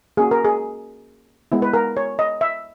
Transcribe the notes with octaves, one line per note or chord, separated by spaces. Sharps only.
A#3 C#4 F#4 G#4
A#4
G#4
G#3 B3 E4
B4
A#4
C#5
D#5
E5